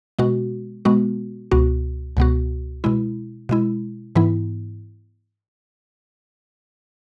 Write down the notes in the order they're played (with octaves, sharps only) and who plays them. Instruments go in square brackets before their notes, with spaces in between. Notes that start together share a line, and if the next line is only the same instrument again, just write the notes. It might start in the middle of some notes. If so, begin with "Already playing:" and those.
[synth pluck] B2 G#3 B3 F#4
B2 G#3 B3 F#4
C#2 B2 B3 F#4
C#2 B2 B3 F#4
B2 G#3 E4
B2 G#3 E4
G#2 E3 B3 E4